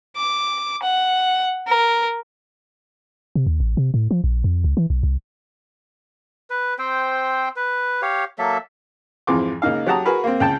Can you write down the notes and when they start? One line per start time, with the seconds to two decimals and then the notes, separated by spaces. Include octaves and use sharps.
0.17 D6
0.83 F#5
1.68 A#4
3.36 C3
3.47 D#2
3.60 A1
3.77 C3
3.94 A2
4.11 F3
4.24 A#1
4.44 F2
4.64 C#2
4.77 E3
4.90 B1
5.03 C2
6.50 B4
6.79 C4 C5 G5
7.56 B4
8.02 G4 C#5 F5
8.39 F#3 A#3 A4 E5
9.27 F2 G#2 E3 F3 C6 D6
9.62 C#2 A#3 D#4 F5
9.86 F#3 G4 F#5 A5 A#5 D#6
10.05 F#4 G#4 A#4 B4
10.24 A#3 C4
10.40 C#2 G5 A5